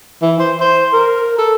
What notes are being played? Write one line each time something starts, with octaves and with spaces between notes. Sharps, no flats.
E3
C5
C5
A#4
A4